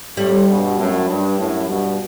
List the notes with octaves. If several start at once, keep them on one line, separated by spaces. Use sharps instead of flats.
A2 C3 G3
G2 B2
F#2 A2
G2
F#2 A2
G2 B2